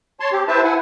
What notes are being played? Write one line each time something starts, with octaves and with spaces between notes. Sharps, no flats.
C#5 A5 C6
C4 G4
E4 B4 C5 E5 A5
E4 F#5 G#5